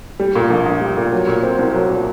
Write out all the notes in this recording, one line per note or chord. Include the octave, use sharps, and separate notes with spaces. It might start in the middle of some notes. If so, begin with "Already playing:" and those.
G3
A#2
A#1
A#1
G3
A#2
F#3
A#2
C4
C2
F#3
A#2